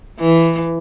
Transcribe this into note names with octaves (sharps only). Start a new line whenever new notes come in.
E3